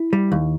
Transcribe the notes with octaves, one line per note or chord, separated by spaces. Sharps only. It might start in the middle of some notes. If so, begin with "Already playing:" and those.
Already playing: E4
G3
D#2